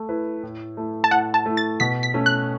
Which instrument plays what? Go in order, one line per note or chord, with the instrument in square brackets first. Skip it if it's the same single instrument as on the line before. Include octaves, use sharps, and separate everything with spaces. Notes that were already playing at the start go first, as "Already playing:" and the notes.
Already playing: [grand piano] A3
E4 B4
A2
A3 E4
[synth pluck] A5
[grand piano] A2 [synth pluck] F#5
[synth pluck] A5
[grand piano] A3 E4
[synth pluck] A6
[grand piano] B2 [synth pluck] B6
[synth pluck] B6
[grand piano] A3 C#4
[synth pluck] F#6